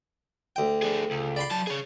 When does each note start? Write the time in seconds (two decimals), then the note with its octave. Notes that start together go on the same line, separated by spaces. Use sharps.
0.56 D2 G5
0.82 D4 G#4
1.11 C#2
1.36 D5 B5 C6
1.51 F#3 A5
1.67 G#4 C#5